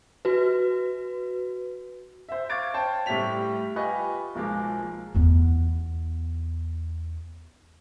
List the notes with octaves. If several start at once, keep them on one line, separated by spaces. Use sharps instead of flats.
F#4 B4
C5 E5
F5 C#6 D6 G#6 A6 D7
C5 C#5 G5 A5
A2 G3 G4 E5 B6 F7
F4 G4 B4 D#5 G#5 C#6
B1 F3 G#3 A#3 D6
E2 B3